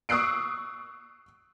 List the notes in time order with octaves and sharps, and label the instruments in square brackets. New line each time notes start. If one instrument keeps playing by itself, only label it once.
[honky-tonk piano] C#6 D#6 E6 F#6 C7 D7